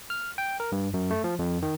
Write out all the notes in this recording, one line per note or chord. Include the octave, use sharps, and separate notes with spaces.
F6
G5
A#4
G2
F#2
A3
F3
F2
D#3